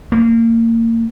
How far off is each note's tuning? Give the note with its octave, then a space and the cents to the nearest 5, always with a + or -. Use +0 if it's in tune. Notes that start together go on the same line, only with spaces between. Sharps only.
A#3 -30